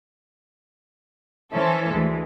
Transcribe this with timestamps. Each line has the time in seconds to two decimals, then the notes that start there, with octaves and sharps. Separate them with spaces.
1.52 E3 C#4 E4 A4 C5
1.93 D2 E3 G#3